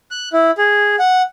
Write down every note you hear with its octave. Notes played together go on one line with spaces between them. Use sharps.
F#6
E4
G#4
F#5